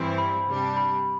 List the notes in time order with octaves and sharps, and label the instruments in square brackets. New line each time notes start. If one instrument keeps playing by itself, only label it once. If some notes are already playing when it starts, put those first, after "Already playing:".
Already playing: [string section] G2 E3 G3 C4 E4
[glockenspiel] B5
[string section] C3 G3 D4
[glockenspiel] B5